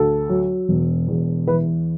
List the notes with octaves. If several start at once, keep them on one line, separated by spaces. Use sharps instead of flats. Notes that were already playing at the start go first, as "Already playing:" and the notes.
Already playing: D2 A4
F#3
E1
E2
E3 B4